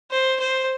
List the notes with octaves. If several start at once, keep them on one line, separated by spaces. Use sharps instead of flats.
C5
C5